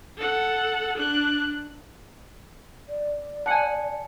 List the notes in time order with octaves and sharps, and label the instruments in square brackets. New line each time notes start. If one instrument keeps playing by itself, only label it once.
[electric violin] A4 F#5
D4 F#6
[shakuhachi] D5
[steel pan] F#5 G#5 [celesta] A5 C#7